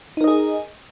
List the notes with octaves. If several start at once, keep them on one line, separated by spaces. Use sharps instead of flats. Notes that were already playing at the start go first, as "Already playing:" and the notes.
D#4 G#4 A#4 D#5